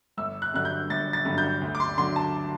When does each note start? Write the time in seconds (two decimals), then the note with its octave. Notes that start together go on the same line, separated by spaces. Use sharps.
0.17 G1 E6
0.42 F#6
0.54 G2 D3 F#3 F#6
0.65 G6
0.90 G1 A6
1.13 A6
1.25 G2 D3 F#3
1.38 G6
1.62 D2
1.75 D6
1.80 C6
1.97 D3 F#3 C6
2.16 A5